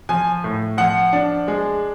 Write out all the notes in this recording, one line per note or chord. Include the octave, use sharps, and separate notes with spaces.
F3 G#5
A2
F3 F#5
D4
G#3